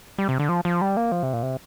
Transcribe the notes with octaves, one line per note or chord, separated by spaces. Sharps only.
G3
C3
D3
F3
F3
G3
A#3
F3
C3
A#2
C3